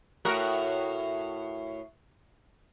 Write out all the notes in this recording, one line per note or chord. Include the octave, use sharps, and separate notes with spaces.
A2 F#4 A#4